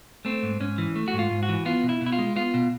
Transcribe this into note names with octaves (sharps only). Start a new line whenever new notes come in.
A3 C4
G#2
G#2 C#4
E3
A3
F#4
G#2
F4
G#2
F#4
E3
B3 F4
B2
E4
B2
E4
F4
G#3
B3 F4
B2